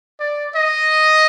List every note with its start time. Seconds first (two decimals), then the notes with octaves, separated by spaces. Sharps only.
0.20 D5
0.56 D#5